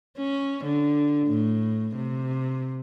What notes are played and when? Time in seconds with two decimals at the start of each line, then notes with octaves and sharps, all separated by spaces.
0.17 C#4
0.65 D3
1.28 A2
1.96 C3